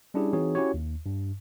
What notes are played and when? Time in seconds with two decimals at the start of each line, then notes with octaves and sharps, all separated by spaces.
0.14 G3 C#4 D4 E4 G4 G#4
0.33 E3 C4 D#4 F#4 G#4 C#5
0.55 C#4 E4 F#4 G4 C#5
0.74 D#2
1.06 G2